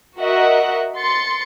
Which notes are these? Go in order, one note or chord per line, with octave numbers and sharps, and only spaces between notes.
F#4 A#4 D#5 E5 F#5
C6 A6 C#7